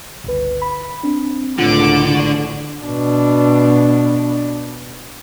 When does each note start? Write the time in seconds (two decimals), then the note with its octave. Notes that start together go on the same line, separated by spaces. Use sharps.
0.24 G1 C#2 B4
0.62 B5
1.03 C4 D4
1.59 C#2 A2 D3 F4 F#5 D6
2.15 A1 D5 C#6
2.83 B2 D4